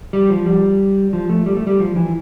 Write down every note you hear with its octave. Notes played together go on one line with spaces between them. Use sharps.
G3
F3
G3
F3
A3
G3
A3
G3
F3
E3